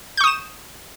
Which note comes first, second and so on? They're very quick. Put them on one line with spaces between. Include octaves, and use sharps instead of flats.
G6 C#6 D#6 E7